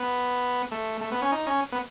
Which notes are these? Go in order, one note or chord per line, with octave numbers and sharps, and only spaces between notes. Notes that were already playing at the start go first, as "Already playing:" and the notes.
Already playing: B3
A3
A3
B3
C#4
D#4
C#4
B3